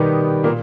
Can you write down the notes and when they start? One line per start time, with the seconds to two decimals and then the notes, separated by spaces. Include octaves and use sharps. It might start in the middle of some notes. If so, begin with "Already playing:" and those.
Already playing: B2 D#3 G3 B3 D#4 G4
0.44 A#2 A#3